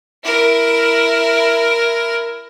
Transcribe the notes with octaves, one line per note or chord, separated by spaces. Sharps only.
E4 A#4